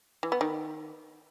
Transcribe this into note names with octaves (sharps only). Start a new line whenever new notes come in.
E3
B3
D#3